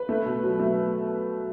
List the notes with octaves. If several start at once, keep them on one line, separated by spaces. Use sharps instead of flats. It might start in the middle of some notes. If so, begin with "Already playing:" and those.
Already playing: B4
A3
B2
F#3
A3